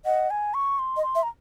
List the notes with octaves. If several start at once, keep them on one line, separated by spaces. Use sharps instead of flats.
D#5 F#5
G#5
C#6
C6
D#5
C6
E5
A#5